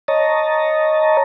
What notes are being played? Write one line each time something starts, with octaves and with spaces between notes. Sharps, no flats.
C#5 D#5 A5 A#5